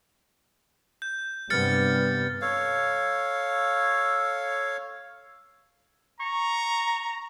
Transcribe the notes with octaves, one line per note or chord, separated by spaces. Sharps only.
G6
G2 C3 B3 F6 A6 C#7
A4 C#5 F5
A#5 C#6